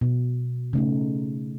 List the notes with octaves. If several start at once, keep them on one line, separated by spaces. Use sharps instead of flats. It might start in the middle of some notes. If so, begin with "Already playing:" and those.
B2
C#3 A3 D#4